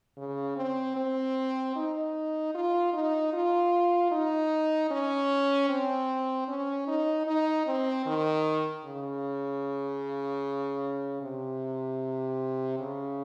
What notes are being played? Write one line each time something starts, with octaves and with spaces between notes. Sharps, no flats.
C#3
C4
C4
D#4
F4
D#4
F4
D#4
C#4
C4
C#4
D#4
D#4
C4
D#3
C#3
C3
C#3